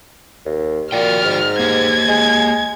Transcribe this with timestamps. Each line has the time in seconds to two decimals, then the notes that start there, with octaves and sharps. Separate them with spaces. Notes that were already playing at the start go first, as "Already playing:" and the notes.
0.45 D#2
0.92 A#2 F#4 D5 G5 F6
1.24 G#2
1.59 A#3 G4 G#6
2.08 G#3